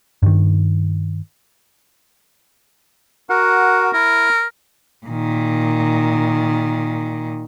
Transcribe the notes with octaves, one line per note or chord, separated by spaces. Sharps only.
G2 D#3
F#4 A#4 F#5
E4 A#4
A#2 D#3